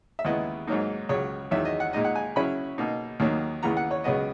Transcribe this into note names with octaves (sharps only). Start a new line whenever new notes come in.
E5
D#2 C#3 G#3 B3 E4 D#5
G#2 F#3 A#3 D#4
C#2 C#3 F#3 C#5
E2 D#3 F#3 E5
D#5
F#5
A#2 G#3 D#4 D#5
F#5
G#5
C#3 F#3 C#4 E4 B5
B2 A#3 D#4
D#2 D#3 F#3 A#3
D#2 C#3 E3 B3 A#5
F#5
C#5
C#2 C#3 F#3 B3 D#5